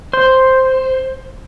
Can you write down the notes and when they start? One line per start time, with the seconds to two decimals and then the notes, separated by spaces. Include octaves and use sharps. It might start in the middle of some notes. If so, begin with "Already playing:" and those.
0.13 C5